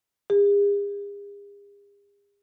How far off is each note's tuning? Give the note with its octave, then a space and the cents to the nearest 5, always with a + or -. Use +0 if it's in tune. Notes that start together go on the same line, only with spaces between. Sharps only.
G#4 -45